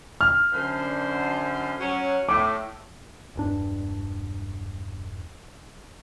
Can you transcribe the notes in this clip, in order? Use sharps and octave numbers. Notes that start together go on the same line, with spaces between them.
F6
F#2 D3 C5
F#3 C#4
A2 D6
E1 G2 D4